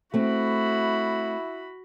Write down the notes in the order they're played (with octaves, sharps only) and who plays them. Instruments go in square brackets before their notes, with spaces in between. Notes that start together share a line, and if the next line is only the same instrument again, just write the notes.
[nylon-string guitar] A3 C4 [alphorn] E4 [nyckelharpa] F#4 B5